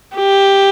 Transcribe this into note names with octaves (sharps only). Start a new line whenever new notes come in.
G4